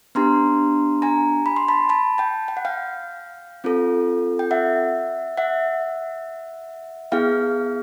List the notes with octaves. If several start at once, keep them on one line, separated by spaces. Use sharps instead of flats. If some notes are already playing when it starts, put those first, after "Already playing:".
B3 D4 G4 A#5 C6
G#5 A#5
B5
C6
A5 B5
A5 B5
G5 A5
G5
F#5
F5 G5
C4 F4 A4
G5
E5 F#5
E5 F#5
B3 E4 G#4 F5 G5